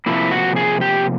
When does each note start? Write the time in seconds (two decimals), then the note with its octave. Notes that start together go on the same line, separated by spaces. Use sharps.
0.06 C3 F3 A#3 E4
0.31 F#4
0.56 G#4
0.81 G4